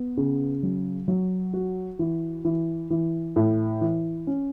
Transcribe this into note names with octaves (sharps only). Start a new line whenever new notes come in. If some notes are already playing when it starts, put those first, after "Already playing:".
Already playing: B3
C#3
F#3
F#3
F#4
E3
E3
E3
A2
E3
C#4